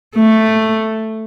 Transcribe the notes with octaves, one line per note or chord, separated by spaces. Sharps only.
A3